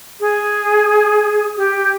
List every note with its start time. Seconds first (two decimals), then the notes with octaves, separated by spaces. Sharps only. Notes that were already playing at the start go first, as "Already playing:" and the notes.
0.20 G#4
1.57 G4